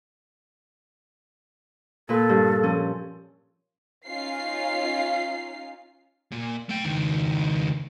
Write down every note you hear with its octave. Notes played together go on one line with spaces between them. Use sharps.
A#2 A4 B4
G2
F3 C#4
C#4 D#4 F4 F5 C7
A#2
A3 G5
C#2 D#3